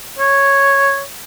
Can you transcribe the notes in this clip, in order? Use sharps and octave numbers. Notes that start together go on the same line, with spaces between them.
C#5